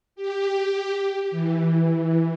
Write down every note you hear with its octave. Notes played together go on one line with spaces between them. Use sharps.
G4
E3